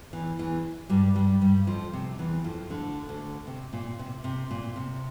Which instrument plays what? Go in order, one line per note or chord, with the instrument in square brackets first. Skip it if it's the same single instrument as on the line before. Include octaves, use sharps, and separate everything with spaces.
[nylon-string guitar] E2 E3
E2 E3
G2 G3
G2 G3
G2 G3
F2 F3
C3
E2 E3
F2 F3
D2 D3
D2 D3
C3
A#2
C3
C3
A#2
C3